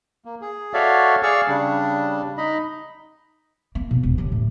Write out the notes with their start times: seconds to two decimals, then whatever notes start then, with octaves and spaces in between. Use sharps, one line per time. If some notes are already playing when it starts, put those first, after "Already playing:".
0.25 A#3
0.42 G#4
0.74 F#4 A4 C#5 D5 E5 F5
1.23 G#4 D5 F5 C#6 E6
1.48 C#3 G3 D4
2.38 D#4 D#5 B5
3.75 A#3
3.91 B2
4.03 E1
4.18 D#2 D3
4.31 A2 D3